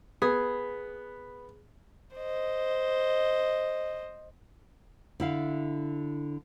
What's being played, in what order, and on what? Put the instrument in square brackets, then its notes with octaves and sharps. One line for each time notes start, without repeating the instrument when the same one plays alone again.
[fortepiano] B3 [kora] G#4
[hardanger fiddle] C5 D#5
[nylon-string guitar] D3 E4 F5